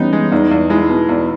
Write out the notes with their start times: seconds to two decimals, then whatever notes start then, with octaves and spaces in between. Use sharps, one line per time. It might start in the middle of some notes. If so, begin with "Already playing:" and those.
Already playing: E3 G3 B3 C#4 D#4
0.13 G#3
0.32 E2 D#4
0.51 E2
0.70 G#3 E4
0.89 B2
1.09 E2